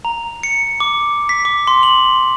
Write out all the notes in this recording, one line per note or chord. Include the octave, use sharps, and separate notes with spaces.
A#5
C#7
D6
B6
D6
C6
F#7